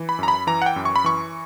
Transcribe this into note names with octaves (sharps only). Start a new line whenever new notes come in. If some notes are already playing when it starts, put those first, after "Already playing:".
Already playing: E3
B5
F#2 A#5
B5
E3 A#5
F#5
G5
F#2
C#6
B5
E3 C#6